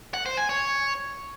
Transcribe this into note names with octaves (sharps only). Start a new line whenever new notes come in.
F#5
C5
G#5
C#5